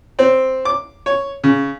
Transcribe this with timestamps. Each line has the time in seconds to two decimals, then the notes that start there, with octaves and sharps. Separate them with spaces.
0.19 C4
0.65 D6
1.06 C#5
1.44 C#3